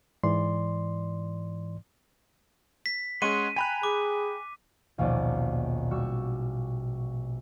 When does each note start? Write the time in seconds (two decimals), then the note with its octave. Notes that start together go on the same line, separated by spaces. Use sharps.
0.23 G#2 E3 D5 C6
2.86 B6
3.22 G#3 C#4 G#4 F#5 C6 C#6 D#7
3.56 G5 G#5 A#5 B5 F#6
3.83 G#4 D6
4.98 A#1 D#2 B2 D#3 C#4 D5
5.91 G3 F#4 C#6 E6